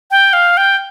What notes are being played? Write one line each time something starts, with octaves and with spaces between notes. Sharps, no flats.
G5
F5
G5